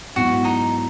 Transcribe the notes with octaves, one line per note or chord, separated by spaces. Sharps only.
G#2 F#3 B3 E4 F#4
D#4